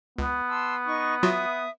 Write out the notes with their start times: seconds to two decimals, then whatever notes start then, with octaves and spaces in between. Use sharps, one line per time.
0.18 C#2 B3
0.48 A5 C6 E6
0.85 D#4 C#6
1.23 F#3 F4 F#4 E5 D#6